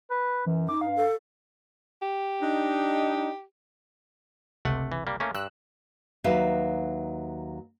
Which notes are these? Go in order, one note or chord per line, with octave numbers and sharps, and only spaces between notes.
B4
F#2 E3
D#4 D6
G2 F5
A4
G4
D4 D#4
G1 C#2 C3 A3 F#5
E3
G3 A#3
A3 A#3 C#4
G2 E6 F#6
D#2 F#3 D#4 B4 E5 F5